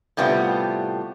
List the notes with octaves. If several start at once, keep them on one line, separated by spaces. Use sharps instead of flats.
A2 C3 G3 B3 F4